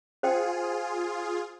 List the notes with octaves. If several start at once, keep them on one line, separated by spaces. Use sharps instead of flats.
F4 G#4 C5 G5